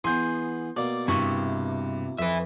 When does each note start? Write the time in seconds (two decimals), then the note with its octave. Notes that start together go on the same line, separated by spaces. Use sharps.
0.04 E3 B3 G#4 C6 G6
0.76 B2 A#3 D5
1.08 G2 C3 E4 C#6
2.19 F2 B4 E5